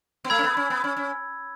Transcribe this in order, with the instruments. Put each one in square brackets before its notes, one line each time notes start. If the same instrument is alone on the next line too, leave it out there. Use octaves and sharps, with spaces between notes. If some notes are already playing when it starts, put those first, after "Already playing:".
[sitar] B3
[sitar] A3 [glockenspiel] B5 E6 G#6
[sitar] C#4
B3
C#4
B3
C#4
C#4